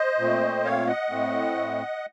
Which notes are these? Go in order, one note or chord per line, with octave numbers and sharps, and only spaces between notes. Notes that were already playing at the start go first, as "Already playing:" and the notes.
Already playing: C5 D#5
A#2 A3 C4
C#5 F5
D#5 F#5
A2 A3 C4